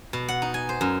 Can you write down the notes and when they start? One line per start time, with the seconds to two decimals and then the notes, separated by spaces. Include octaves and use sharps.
0.13 B2
0.28 F#5
0.42 D#4
0.54 G#5
0.69 C5
0.81 F#2